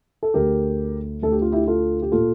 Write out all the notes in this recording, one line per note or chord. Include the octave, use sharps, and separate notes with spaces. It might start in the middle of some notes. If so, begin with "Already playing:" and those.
A4
D2 D3 G4 A#4
D2 D3 A4
G4
F4
E4 G4
F4 A4
G4
A#2 F4 A4